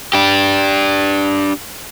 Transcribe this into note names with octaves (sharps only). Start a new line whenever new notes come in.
D4 G4